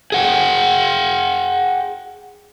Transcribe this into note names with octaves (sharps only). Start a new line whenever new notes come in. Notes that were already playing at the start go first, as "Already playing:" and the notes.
G#4 F#5 G5